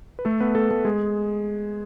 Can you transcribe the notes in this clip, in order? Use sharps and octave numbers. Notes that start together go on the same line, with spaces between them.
B4
A3 A4
B3 B4
A3 A4
A3 A4
G#3 G#4